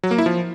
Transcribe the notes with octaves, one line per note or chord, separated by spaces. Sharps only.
F#3
A#3
E4
F3